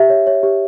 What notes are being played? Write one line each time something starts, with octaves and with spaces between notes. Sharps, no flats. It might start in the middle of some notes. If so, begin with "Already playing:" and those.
Already playing: G4 E5
C#5
C#5
G4